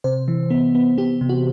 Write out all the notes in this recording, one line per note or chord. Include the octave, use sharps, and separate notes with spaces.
C3 C5
E3
B3
B3
B3 G4
C3
F#4